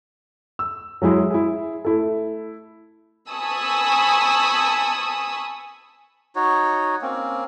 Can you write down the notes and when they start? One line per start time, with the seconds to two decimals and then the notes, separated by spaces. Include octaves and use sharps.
0.59 E6
1.02 F#3 G#3 E4 G#4
1.31 E4 G#4
1.85 A3 E4 A4
3.30 G#5 A5 B5 C#6 D#6 E6
6.36 D#4 F#4 C#5
7.02 A#3 C4 C#4